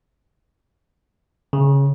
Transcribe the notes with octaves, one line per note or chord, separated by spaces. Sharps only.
C#3